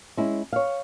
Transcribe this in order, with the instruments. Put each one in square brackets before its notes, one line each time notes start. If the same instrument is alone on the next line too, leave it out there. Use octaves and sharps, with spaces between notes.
[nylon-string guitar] G#3 C#4 E4
C#5 F5